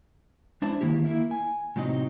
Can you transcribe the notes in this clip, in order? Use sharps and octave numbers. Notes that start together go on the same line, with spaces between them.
G#3 D4 E4 C5 A5
D#3 A#3 E4 G4
A#3 E4 A#4 E5
G#5
A2 C3 F#3 C4 D#4 D#5